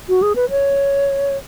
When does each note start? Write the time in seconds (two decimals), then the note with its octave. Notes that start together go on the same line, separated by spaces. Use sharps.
0.09 F#4
0.22 G#4
0.36 B4
0.50 C#5